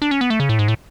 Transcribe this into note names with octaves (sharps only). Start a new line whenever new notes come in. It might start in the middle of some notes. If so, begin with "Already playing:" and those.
D4
C#4
B3
A3
C#3
A2
G#2
A2